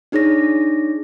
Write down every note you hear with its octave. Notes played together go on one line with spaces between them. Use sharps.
D4 D#4 G#4 C#5 A#6